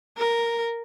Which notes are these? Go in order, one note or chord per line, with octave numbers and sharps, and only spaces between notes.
A#4